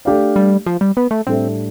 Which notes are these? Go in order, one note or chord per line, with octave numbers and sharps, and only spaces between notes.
A3 D4 G4 D5 F5
G3
F3
G3
B3
A3
A2 G3 C4 D4 A4 E5